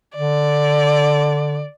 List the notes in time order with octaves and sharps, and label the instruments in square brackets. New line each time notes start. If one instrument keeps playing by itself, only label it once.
[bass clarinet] D3 [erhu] D5